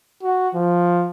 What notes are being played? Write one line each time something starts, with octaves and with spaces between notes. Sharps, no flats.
F#4
F3